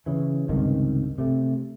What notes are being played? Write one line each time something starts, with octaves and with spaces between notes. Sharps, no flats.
C#3 E3
C#2 G2 C3 D#3
C3 A3